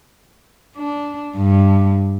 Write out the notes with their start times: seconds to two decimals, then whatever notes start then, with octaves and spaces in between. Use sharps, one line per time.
0.77 D4
1.36 G2